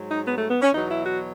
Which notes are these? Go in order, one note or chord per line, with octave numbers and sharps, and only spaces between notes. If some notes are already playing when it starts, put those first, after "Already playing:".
Already playing: G#2 F#3
D#4
B3
A3
B3
C#4
E2 B2 F#3 D#4
E4
F#4